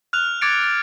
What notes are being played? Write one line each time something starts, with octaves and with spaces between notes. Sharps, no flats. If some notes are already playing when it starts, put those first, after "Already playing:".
F6 F#6 F7
D6 G#6 A6 C#7 D7
A6